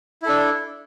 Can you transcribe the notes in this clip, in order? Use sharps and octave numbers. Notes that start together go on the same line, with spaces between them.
D4 E4 A4